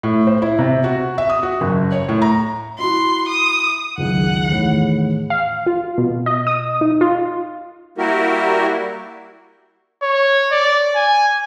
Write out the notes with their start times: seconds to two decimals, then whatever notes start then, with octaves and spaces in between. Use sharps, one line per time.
0.03 A2
0.27 C5
0.42 E4
0.59 C3
0.84 F#4
1.18 E5
1.29 D#6
1.43 F#4
1.61 F#1
1.92 C#5
2.09 A2
2.22 A#5
2.79 E4 F#4 C6
3.28 D#6
3.98 F#1 C#2 D#3 F#5
4.49 E2 A2 D#3
5.30 F5
5.66 F4
5.98 B2
6.26 D#5
6.47 D#6
6.81 D#4
7.01 F4
7.98 G3 A#3 E4 F#4 G4 A#4
10.02 C#5
10.51 D5
10.95 G#5